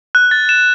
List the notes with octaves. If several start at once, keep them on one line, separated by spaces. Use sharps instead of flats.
F#6
A6
E7